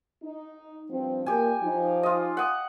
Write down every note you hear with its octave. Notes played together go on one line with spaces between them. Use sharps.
D#4
G2 F3 C4
A#2 G4 G#5
F3 D#4
F4 D#5
F#5 D#6